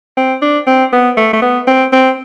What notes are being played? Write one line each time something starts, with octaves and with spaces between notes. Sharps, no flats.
C4
D4
C4
B3
A3
A3
B3
C4
C4